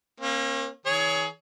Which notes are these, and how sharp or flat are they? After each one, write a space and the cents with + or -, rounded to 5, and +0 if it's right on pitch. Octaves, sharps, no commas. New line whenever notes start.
A#3 +10 C#4 -40
E3 -35 G#4 +20 C#5 +25